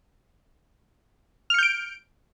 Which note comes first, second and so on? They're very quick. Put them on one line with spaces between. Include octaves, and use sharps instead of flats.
F6 C#7 G6 D7